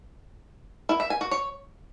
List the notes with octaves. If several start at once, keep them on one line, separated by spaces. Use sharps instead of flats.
E4
E5
G#5
F#4
C#5